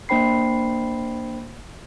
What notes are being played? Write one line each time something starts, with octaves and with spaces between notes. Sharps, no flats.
A#3 D4 C5 G5 B5 C7